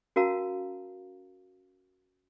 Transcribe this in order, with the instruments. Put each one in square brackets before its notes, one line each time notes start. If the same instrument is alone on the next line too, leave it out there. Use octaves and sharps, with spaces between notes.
[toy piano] C#4 F#4 A#4 F5 A5 A#5